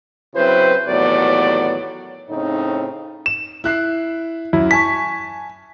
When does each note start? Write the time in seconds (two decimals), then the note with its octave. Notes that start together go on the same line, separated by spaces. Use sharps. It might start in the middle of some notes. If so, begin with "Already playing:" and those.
0.35 C#3 F#3 C4 E4 B4 C5
0.87 D#2 A2 E3 F#3 B3 D5
2.30 A2 C#3 C4 D#4
3.26 E7
3.64 E4 F#6 C7
4.53 F#2 E4
4.71 G#5 A5 C#6 B6